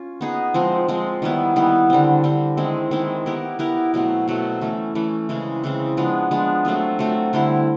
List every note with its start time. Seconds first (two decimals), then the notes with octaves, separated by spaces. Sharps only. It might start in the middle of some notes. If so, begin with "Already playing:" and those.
Already playing: C#4 F4
0.21 B3 D#4 G#4
0.54 F3 G#3 C4
0.88 F3 G#3 C4
1.22 D#3 G3 B3 E4
1.56 D#3 G3 B3 E4
1.90 D3 G3 C4
2.24 D3 G3 C4
2.57 D#3 G#3 C4 E4
2.91 D#3 G#3 C4 E4
3.26 B3 E4 G4 A#4
3.59 B3 E4 G4 A#4
3.94 B2 F#3 A3 C4
4.28 B2 F#3 A3 C4
4.61 E3 A3 C#4
4.95 E3 A3 C#4
5.29 C#3 E3 G#3 C4
5.64 C#3 E3 G#3 C4
5.97 F3 G#3 B3 D4
6.31 F3 G#3 B3 D4
6.65 F#3 A3 C4 F4
6.99 F#3 A3 C4 F4
7.33 D3 G3 C4 E4